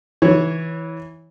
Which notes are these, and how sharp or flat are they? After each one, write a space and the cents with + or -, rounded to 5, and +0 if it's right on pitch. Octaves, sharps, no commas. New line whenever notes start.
E3 -15 C#5 +0